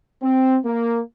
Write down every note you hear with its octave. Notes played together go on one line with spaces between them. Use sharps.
C4
A#3